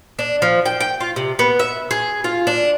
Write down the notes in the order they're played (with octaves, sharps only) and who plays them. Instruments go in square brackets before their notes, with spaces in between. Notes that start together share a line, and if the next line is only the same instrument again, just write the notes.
[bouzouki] D4
F3
G5
G5
F4
C3
B3
E5
G#4
F4
D4